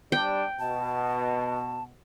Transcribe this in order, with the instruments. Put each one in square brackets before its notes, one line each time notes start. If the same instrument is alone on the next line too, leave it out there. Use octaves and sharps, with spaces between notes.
[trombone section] G3 D4 [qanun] G5
[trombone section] B2 [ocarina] A5